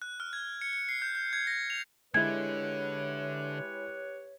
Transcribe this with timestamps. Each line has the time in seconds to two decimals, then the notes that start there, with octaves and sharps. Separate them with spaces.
0.02 F#6
0.20 F6
0.33 G#6
0.61 C#7
0.73 C#7
0.89 C7
1.02 G6
1.15 G6
1.33 G#6
1.47 A#6
1.70 F7
2.14 D3 G#3 E4 G4 B4 C#5 G#6